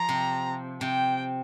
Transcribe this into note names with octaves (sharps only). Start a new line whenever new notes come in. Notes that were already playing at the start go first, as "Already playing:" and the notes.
Already playing: F3 A#5
C3
C3 G5